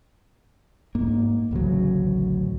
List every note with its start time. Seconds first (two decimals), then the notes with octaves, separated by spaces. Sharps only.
0.95 G#2 A#3
1.51 A1 D2 C#3 F#3